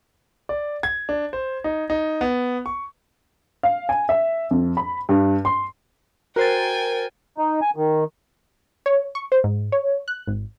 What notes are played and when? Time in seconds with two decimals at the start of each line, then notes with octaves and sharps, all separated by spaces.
0.49 D5
0.83 G#6
1.09 D4
1.33 C5
1.64 D#4
1.90 D#4
2.21 B3
2.66 C#6
3.63 F5
3.89 G#5
4.09 E5
4.51 F2
4.77 B5
5.09 G2
5.45 C6
6.36 F#4 A#4 C5 G5 G#5 A6
7.38 D#4
7.62 G#5
7.76 D#3
8.86 C#5
9.15 C#6
9.32 C5
9.44 G#2
9.72 C#5
10.08 F#6
10.27 G#1